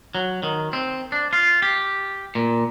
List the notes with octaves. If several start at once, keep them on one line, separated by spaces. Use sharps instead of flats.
F#3
D#3
C4
D4
F4
G4
A#2